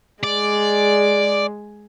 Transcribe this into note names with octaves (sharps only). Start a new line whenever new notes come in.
G#3 D5